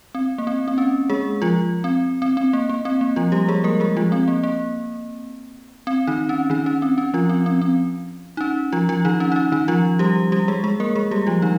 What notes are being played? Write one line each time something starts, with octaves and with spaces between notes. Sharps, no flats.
C4
A#3
C4
C4
C#4
G#3 G#4
F3 F4
C4
C4
C4
A#3
A#3
C4
A#3
F3 F4
G3 G4
G#3 G#4
A#3 A#4
G#3 G#4
F3 F4
C4
A#3
A#3
C4
D#3 D#4
C#4
D#3 D#4
C#4
C4
C#4
F3 F4
C4
C4
C4
D#4
C#4
F3 F4
F3 F4
D#3 D#4
C#4
D#4
C#4
D#3 D#4
F3 F4
G3 G4
G3 G4
G#3 G#4
G#3 G#4
A#3 A#4
G#3 G#4
G3 G4
F3 F4
D#3 D#4